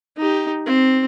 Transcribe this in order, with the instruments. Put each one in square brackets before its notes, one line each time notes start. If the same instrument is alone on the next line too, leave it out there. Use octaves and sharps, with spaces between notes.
[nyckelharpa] D#4 G4
C4